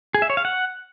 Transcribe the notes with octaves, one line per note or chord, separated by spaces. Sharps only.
G#4
E5
C#5
F5
F#5